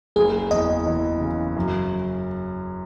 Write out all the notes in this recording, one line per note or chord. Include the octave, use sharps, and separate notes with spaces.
F#1 G#4
E2 D#5
E3
C#3
F#2